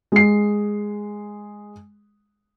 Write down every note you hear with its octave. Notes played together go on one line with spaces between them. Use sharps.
G#3 C7